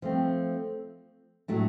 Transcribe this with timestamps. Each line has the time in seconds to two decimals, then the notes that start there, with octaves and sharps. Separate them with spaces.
0.02 F3 A3 C4
1.48 A2 F#3 A3 D4 F#4